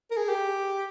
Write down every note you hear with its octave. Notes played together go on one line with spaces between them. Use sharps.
A#4
G#4
G4